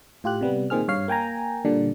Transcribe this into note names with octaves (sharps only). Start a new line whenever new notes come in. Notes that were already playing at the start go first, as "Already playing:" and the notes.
A2 F4 G4 F#6
C3 G3 B3
A#2 D#3 C4 G#4 F6
G2 C#5 F5 C7
A#3 G5 G#5 A#5
A#2 D3 G3 D4